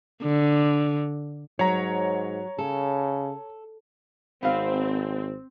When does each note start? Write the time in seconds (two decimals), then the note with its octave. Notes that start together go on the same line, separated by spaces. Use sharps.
0.22 D3
1.59 G#2 F#3 C#5 A#5
2.59 C#3 A4
4.43 G#1 B3 C4 F5